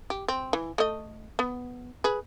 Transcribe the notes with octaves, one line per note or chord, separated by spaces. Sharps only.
G4
C4
E3
A3 D#5
B3
G#4 B4